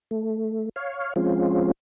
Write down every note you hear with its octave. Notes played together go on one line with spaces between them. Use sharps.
A3
C#5 F5
F3 G#3 C4 C#4 F4